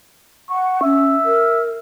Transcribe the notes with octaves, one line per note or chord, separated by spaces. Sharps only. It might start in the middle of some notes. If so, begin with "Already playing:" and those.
F#5 C#6
C#4 E5
A#4